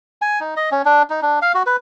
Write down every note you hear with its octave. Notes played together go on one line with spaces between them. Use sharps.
G#5
D#4
D#5
C#4
D4
D#4
D4
F5
F#4
B4